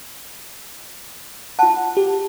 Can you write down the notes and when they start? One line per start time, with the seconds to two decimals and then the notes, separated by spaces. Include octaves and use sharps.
1.59 F4 F#5 A5
1.97 G4